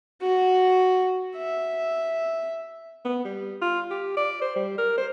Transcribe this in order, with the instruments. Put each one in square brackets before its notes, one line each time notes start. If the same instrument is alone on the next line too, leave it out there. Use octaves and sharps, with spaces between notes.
[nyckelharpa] F#4
E5
[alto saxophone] B3
G3
F4
G4
D5
C5
G3
A#4
C5